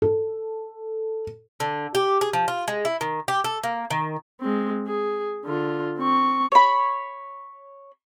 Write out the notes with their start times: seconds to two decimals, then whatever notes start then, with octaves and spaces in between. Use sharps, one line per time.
0.02 A4
1.60 D3
1.95 G4
2.21 G#4
2.33 F3
2.48 F4
2.68 G#3
2.85 E4
3.01 D#3
3.28 G4
3.44 A4
3.63 A#3
3.90 D#3
4.41 G#3 C4
4.87 G#4
5.45 D3 F4
5.99 C4 C#6
6.52 C#5 B5